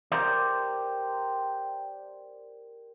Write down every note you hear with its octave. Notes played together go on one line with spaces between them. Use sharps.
G4 A#4 C5 D5